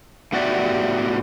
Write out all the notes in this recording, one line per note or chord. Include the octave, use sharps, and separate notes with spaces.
A2 B3 F#4 G4 D5 E5